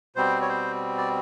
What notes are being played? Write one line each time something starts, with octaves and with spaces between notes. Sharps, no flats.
B2 G3 C4 C5
C#5
C5
D5